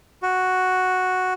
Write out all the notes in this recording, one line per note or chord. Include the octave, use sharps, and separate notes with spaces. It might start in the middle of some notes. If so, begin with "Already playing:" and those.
F#4